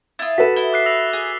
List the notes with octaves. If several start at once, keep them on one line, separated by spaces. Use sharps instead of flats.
E4 F4 D#6 A6
F#4 A4 B4 B6 E7
E4 G7
D6 F#6 C7
E6 A#6 F7
G#4